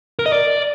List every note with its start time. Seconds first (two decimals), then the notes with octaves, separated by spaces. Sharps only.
0.19 A#4
0.26 D#5
0.32 D5